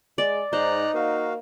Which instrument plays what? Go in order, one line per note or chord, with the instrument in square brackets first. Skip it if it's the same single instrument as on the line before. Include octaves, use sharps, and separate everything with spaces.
[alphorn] G#3 [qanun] D5
[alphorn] G#2 [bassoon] D#4 [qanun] C5 [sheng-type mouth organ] D5 A#5 F#6
[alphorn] A#3 [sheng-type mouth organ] F#4 F5